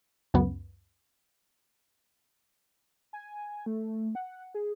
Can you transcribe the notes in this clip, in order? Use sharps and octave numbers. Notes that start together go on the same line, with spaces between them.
C#2 F#2 B3
G#5
A3
F#5
G#4